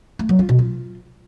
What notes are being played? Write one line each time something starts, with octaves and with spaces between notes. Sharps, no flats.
A3
F#3
F4
B2
F4